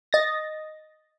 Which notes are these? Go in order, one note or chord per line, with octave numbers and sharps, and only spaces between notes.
D#5 A6 A#6